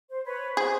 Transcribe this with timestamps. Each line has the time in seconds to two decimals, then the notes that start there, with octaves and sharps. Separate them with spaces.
0.09 C5
0.25 B4 C#5
0.57 G#4 C5